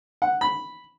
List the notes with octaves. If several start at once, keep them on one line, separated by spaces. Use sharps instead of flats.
F#5
B5